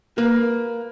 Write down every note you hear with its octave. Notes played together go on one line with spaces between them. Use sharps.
A#3 B4